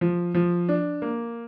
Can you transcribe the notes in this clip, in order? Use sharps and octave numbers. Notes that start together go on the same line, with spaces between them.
F3
F3
D4
A#3